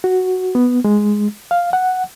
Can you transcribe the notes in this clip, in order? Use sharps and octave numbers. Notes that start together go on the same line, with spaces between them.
F#4
B3
G#3
F5
F#5